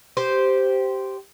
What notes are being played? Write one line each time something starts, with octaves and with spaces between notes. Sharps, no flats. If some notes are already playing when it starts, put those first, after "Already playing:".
G4 C5